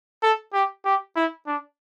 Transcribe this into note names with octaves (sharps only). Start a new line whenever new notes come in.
A4
G4
G4
E4
D4